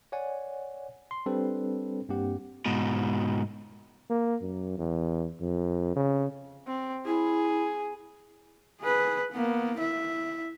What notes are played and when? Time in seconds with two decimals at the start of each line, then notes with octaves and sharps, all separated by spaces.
0.12 C#5 D5 F#5 G#5
1.11 C6
1.26 G3 C4 D4 A4 B4 C5
2.09 G2 A#3 C4 G4 F#5
2.66 G#2 B2
4.10 A#3
4.42 F#2
4.78 E2
5.41 F2
5.96 C#3
6.67 C4
7.06 E4 G#4
8.81 G#4 B4
9.32 A#3 B3
9.77 E4 E5